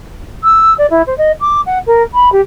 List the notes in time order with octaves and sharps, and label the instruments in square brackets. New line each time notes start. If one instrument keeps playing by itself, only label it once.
[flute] E6
D5
E4
C5
D#5
D6
F#5
A#4
B5
G4